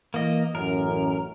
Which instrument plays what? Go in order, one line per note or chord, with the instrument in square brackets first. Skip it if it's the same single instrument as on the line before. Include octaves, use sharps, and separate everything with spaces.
[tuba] E3 [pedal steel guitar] A#3 D#5
[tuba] A1 [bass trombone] F#2 [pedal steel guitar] A#4